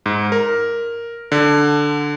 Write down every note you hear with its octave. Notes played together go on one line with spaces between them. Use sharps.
G#2
A#4
D3